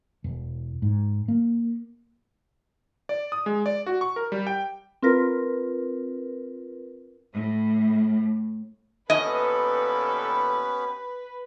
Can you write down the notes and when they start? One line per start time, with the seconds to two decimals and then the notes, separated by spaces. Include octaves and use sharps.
0.24 E1
0.82 G#2
1.28 A#3
3.09 D5
3.32 D#6
3.46 G#3
3.66 D5
3.86 F#4
4.01 C#6
4.16 A#4
4.32 G3
4.47 G5
5.02 C4 F4 A#4 B4
7.34 A2
9.10 D#2 A#2 B3 C#4 G4 A4 B4 D#5